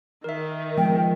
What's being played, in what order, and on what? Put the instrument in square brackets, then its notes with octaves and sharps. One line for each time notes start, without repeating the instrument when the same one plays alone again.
[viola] D#3 [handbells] A#4 E5
[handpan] F3 G#3 B3 [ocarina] G5